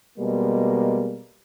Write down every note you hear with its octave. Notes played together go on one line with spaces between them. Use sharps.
B2 G3 G#3 A#3